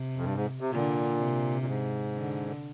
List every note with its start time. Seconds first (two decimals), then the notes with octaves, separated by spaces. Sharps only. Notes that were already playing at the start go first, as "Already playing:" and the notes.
Already playing: C3
0.16 F2
0.24 G2
0.36 G#2
0.60 C3
0.72 A#2 D3
1.19 C3
1.61 A#2
1.67 G#2
2.15 D3